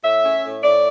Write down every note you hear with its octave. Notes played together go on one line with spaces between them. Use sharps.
A2 E5
C#4
A2
A2 D5